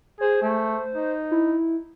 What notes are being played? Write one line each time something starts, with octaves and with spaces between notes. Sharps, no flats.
G#4 C5
A3
D#4
E4